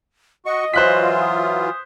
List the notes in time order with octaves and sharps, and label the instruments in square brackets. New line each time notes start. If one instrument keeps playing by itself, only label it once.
[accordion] F#4 C#6 [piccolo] D#5
[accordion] E3 F#3 F4 [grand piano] C5 F#6 B6
[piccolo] D#6